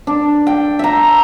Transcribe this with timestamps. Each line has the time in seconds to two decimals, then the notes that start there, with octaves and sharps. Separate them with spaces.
0.07 D4
0.47 G5
0.79 E5 A#5